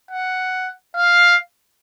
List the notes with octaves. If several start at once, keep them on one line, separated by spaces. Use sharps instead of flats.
F#5
F5